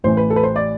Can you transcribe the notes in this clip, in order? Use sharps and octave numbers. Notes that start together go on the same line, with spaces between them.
A1 A2 E3 C5
B4
A4
B4
C5
D5